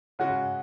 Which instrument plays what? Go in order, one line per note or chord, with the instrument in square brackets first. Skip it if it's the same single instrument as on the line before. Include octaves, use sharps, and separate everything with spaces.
[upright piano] C#3 G#3 C#4 F#4 [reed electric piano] F#5